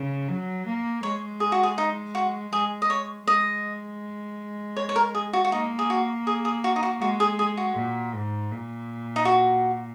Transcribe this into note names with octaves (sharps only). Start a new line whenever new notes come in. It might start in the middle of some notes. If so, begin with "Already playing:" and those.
Already playing: C#3
F#3
A#3
G#3 C#5
G#4
F#4
G#4
D#4
F#4
G#3 G#4
D#5
C#5
G#3 D#5
C#5
C#5
A#4
G#4
F#4
F#4
A#3 D#4
G#4
F#4
G#4
G#4
F#4
D#4
F#4
G#3 F#4
G#4
G#4
F#4
A#2
G#2
A#2
D#4
F#4